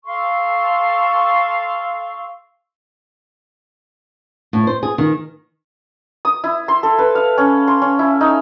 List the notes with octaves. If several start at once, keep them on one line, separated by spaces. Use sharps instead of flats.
A4 F5 C6 C#6
A2
C5
G#4
D#3
D#6
E4
C6
A4
B4
F5
C#4
C6
C#4
E4
D#4